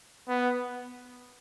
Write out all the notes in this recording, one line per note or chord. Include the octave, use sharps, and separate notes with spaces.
B3